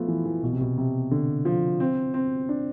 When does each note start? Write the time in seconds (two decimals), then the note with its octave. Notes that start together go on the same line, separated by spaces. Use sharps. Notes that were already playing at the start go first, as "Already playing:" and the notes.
Already playing: F3 A3 B3
0.08 E3
0.25 E3
0.43 B2
0.53 C3
0.61 B2
0.78 C3
1.11 D3
1.45 F3
1.80 C4
2.14 C4
2.49 D4